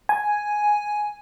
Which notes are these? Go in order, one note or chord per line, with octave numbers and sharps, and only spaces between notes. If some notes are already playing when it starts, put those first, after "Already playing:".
G#5